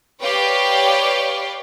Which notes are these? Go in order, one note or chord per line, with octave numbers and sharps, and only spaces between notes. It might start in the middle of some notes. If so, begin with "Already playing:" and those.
G4 B4 C#5 D5 F5 G5